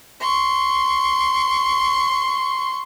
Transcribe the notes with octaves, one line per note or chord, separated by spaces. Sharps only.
C6 C#6